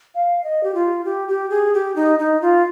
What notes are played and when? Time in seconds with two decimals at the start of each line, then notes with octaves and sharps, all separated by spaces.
0.15 F5
0.44 D#5
0.63 G4
0.75 F4
1.05 G4
1.28 G4
1.50 G#4
1.74 G4
1.96 D#4
2.19 D#4
2.42 F4